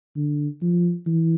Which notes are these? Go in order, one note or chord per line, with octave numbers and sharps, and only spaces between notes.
D3
F3
E3